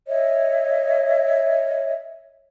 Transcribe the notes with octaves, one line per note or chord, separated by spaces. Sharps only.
C#5 D#5 E5